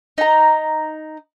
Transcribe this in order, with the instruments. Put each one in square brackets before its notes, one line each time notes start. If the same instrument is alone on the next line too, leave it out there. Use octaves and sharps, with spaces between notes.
[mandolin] D#4 A#5